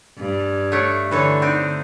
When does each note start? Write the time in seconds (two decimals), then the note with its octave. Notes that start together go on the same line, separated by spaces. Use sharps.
0.19 G2
0.72 A3 D4 C#5
1.11 D3 E3 A4 C#5
1.42 C4 D4 D#4